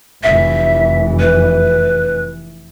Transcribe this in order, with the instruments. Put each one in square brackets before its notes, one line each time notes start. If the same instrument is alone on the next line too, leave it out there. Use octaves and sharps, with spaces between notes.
[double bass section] F1 E3 [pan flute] E5
[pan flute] B4